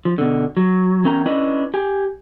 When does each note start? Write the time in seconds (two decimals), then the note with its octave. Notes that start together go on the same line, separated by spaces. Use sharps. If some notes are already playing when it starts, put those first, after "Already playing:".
0.05 F3
0.18 B2 D3
0.57 F#3
1.04 E2 C#4 A#4 G5 A5 A#5
1.26 C#4 D4 E4 B4 D#5
1.74 G4 G#5